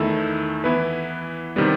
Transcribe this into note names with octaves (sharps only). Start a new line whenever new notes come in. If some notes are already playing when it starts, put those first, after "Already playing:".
Already playing: E2 D#3 A3 E4 A4
E3 B3 E4 B4
C3 D#3 G3 B3